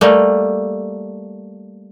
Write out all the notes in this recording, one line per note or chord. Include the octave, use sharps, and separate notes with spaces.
G3 A3 A#3